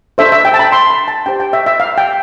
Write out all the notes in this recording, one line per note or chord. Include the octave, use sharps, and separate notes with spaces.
D4 A4 C5 E5
E5
G5
A5
B5
C6
B5
A5
D4 G4 C5 G5
G5
E5
E5
F5
G5